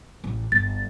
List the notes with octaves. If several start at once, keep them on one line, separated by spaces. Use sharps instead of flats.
A1
G1 A6